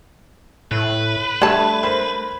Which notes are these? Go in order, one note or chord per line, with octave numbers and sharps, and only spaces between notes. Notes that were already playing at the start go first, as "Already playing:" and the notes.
A2 B4
G3 A3 D4 A5 G#6
A#4 C5 B5